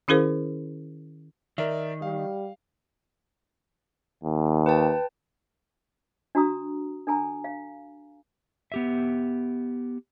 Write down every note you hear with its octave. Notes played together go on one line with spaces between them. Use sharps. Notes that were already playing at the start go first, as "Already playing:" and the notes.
D#3 C#4 E4 G#4 A#4 C5
D#3 A#4 D5 E5
G3 F5
D#2
B4 G5 A5
D4 F#4 A#5 D#6
D4 A4 G#5 A#5
F5
B3 G4 E5